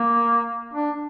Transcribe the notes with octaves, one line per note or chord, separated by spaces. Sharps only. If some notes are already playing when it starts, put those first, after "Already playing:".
Already playing: A#3
D4